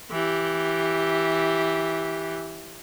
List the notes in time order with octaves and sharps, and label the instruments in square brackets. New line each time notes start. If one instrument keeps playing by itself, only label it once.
[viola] E3 G4